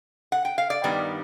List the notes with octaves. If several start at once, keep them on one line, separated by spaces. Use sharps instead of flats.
F#5
G5
F5
D5
G2 D#3 G3 B3